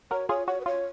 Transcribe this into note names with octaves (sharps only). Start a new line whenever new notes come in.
F#4 A#4 C#5
F4 G#4 C#5
F#4 C#5
B4
F4 C#5